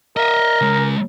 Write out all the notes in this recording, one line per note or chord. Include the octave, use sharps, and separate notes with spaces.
A#4 D#5 E5
C#3 G#3